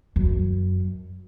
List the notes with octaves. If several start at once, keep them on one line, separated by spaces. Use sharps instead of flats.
F#2